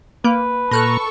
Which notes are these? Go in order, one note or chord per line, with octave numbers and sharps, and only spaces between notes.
A#3 B4
A#2 A4 A#5 B5 C#6 F6 F#6